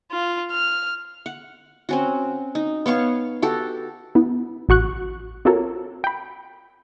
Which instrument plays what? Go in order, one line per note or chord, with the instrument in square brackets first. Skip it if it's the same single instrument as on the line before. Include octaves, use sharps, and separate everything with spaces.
[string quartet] F4
F6
[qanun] F#5
C4 C#4 F#4
D#4
B3 C#5 F5 C#6
F#4 G4 A4
[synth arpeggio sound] B3 E4
A1 F#4 C#6 F#6
C4 F4 F#4 A4 A#4 C#5
G5 B5